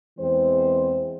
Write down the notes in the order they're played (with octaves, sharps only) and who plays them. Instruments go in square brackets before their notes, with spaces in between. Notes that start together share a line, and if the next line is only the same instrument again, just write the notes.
[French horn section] E2 E3 G#3 C4 C5